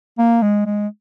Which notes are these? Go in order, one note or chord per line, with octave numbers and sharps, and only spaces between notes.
A#3
G#3
G#3